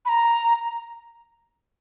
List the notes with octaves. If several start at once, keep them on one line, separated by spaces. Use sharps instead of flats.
B5
A#5